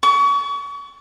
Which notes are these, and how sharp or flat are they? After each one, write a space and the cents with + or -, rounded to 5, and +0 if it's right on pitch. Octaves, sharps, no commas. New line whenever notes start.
C#6 +35